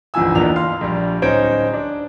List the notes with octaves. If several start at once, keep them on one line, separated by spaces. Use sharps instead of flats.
G1 C#2 E3 F3 G#5 E6
E2 A#3 D4 D#4 F4 F7
F5 C6 F6
A#1 G3
D1 C#4 D#4 C5 C#5 D7
D4